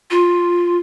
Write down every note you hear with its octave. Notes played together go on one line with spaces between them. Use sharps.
F4